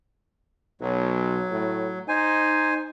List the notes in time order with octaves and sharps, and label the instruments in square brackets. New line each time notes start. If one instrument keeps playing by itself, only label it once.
[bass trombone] B1 [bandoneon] F#3
[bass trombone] A2
[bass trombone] D#4 [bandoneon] C5 G#5